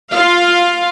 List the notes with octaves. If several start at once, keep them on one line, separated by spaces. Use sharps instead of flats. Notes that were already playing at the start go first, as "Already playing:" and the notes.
F4 F5